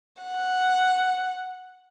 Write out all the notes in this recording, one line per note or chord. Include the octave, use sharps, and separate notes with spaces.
F#5